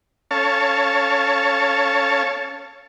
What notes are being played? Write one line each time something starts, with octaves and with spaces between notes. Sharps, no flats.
C#4 A4 C#5 F5 A5